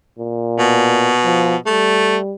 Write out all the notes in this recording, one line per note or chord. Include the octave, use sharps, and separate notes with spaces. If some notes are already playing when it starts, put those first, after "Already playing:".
A#2
B2
F3
G3 A3